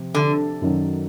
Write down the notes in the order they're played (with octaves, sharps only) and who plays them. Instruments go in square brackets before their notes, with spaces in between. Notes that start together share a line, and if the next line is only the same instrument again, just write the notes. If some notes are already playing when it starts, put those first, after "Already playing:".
Already playing: [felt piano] C3 F3
[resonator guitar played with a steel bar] D3
[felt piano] F#2 D#3 F#3